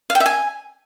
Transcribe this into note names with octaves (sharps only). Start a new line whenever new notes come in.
F5
G5
E5
G#5